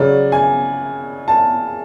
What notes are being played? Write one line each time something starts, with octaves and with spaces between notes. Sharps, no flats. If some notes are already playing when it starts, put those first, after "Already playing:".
Already playing: C#3 F#3 D5
G#5
A5